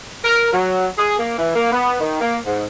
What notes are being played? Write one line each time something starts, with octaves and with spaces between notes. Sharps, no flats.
A#4
F#3
G#4
A#3
E3
A#3
B3
D#3
A#3
G#2